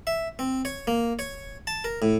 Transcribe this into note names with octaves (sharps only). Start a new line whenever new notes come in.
E5
C4
C#5
A#3
C#5
A5
A#4
A2